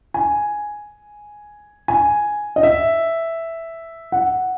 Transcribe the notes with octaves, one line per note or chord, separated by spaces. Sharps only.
G#5
G#5
D#5
E5
F#5